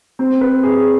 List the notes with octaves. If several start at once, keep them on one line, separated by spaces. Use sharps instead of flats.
C4
B4
G#4